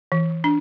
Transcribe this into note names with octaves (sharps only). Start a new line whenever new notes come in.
E3
D4